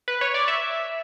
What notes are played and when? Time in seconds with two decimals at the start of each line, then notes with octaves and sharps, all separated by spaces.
0.08 B4
0.21 C#5
0.34 D5
0.48 E5